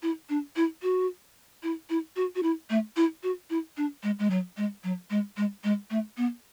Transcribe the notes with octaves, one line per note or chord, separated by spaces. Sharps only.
E4
D4
E4
F#4
E4
E4
F#4
F#4
E4
A3
E4
F#4
E4
D4
G#3
G#3
F#3
G#3
F#3
G#3
G#3
G#3
A3
B3